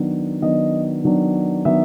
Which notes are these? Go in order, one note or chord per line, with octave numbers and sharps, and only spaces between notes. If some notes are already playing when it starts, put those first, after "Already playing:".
Already playing: D#3 F#3 B3 D4
D#3 F#3 B3 D4 D#5
D#3 F#3 B3 D4
D#3 F#3 B3 D4 E5